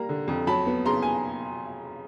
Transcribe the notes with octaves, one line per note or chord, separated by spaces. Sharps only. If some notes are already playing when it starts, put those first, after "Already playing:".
Already playing: G3 A#3 A#5
D3
F2
F#3 A5 B5
B3
C#3 A#5 C6
G#5